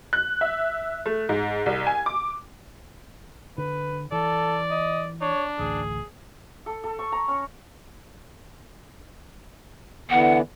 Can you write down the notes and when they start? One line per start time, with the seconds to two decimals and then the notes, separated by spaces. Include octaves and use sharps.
0.13 F#6
0.41 E5
1.06 A3
1.29 G#2
1.66 C2
1.87 G#5
2.06 D6
3.58 D3 B4
4.12 E3 A4 D5
4.71 D#5
5.21 D4 C#5
5.59 A1 D2 G#4
6.66 A4
6.84 A4
6.99 C#6
7.12 A#5
7.28 C#4
10.10 D3 E3 B3 F#5